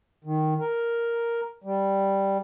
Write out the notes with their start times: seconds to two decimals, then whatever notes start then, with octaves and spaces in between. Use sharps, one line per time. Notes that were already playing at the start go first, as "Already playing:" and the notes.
0.24 D#3
0.60 A#4
1.64 G3